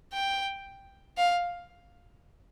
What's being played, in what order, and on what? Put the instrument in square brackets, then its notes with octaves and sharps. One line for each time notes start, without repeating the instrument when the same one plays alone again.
[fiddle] G5
F5